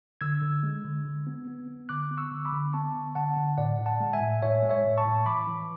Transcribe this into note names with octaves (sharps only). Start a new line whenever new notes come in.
D3 E6 G#6
D3
G#3
D3
D3
B3
B3
B3
D3 D6 F#6
B3
C#6 E6
D3
B5 D6
D3
B3 A5 C#6
D3
D3 F#5 A5
D3
A2 D5 F#5
A2
F#5 A5
G#3
E5 G#5
A2
A2 C#5 E5
G#3
C#5 E5
A2
A5 C#6
A2
E3 B5 D6
E3